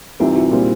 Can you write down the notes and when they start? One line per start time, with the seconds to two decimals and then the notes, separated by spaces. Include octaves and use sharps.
0.20 C2 C3 E3 D#4 F4
0.36 E4 F#4
0.51 A#2 G3 C4